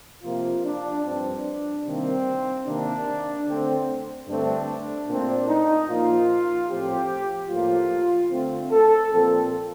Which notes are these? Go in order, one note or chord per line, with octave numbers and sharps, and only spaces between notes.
C3 F3 A#3 F4
D4
G2 F3 C4 D4
C3 D#3 G3 A#3 C4
C3 D#3 A#3 D4
D3 A3 C4
G2 D3 A3 C4 D4
A#2 A3 C4 D4
D#4
A#2 F3 A#3 F4
A2 F3 C4 G4
A2 F3 A#3 F4
D3 A3 C4
A4
A#2 F3 C4